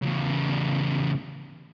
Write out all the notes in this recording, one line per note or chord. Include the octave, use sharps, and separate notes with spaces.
E2 C#3